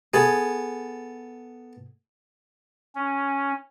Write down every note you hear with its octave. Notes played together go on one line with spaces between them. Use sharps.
B3 G#4 A4
C#4